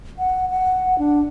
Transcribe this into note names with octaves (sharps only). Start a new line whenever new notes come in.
F#5
F#5
D4